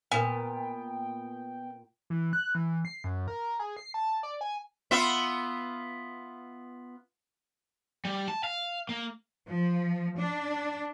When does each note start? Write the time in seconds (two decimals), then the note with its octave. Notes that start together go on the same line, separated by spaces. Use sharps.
0.12 A#2 B3 F4 A#4 G5 G#5
2.10 E3
2.33 F#6
2.55 E3
2.85 C7
3.04 F#2
3.28 A#4
3.59 G#4
3.77 C7
3.94 A5
4.23 D5
4.41 G#5
4.91 B3 F4 E5
8.05 G3
8.28 A5
8.44 F5
8.89 A#3
9.49 F3
10.18 D4